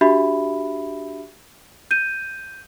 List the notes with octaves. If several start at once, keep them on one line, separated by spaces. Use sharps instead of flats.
D4 F#4 G4 E5 B5
G6 D#7